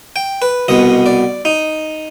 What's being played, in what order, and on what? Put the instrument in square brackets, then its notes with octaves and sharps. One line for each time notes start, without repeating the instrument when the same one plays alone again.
[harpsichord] G5
B4
C2 B2 B3 D#5
D5
D#4